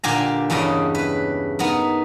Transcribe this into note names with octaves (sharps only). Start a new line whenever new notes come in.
A#2 D3 G4 F5 G#5 A#5
E2 G2 C#3 G3 D#5
B4
B3 D#4 A#4